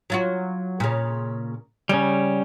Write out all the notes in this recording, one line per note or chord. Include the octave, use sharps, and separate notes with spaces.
F#3 F4 F#4
A#2 C#3
C#3 G3 C#4